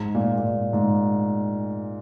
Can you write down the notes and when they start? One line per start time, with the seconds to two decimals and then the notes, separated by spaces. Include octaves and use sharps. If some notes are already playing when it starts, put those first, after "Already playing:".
Already playing: G#2
0.14 A#2
0.37 A#2
0.44 G#2
0.73 G#2